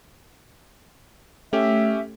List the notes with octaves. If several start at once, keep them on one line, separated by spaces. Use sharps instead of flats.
A3 C#4 G4 E5